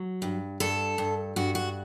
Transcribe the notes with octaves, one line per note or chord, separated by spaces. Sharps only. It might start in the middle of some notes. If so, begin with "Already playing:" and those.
Already playing: F#3
G2
G2 A4
G2
G2 F#4
F#4